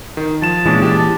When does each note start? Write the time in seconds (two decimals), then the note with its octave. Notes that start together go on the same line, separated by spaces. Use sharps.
0.17 D#3
0.42 F3 A5 E7
0.66 A#2 E3 G#3 C#4 D4
0.82 G4